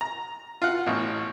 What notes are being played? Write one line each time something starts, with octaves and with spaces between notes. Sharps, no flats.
A#5
F4 F5 F#5
A1 B2